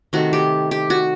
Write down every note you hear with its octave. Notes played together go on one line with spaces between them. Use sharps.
C3 D#3 A3 F#4
G4
G4
F#4